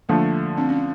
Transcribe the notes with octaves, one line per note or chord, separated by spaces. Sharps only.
D3 F3 A3 A#3
C4 D4
C#4